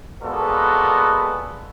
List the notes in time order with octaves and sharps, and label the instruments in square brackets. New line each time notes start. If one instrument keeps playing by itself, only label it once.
[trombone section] A#2 G#3 B3 F#4 A4